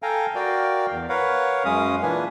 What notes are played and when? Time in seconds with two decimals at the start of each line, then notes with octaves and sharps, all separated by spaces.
0.03 A4 F5 G5 G#5 A#5
0.35 F#4 A#4 D5 F5 G5
0.91 E2
1.09 A#4 B4 C#5 F5 F#5
1.65 F#2 G#3 C#4 F5 D#6
2.03 A#2 E3 A#3 D4 B4 G#5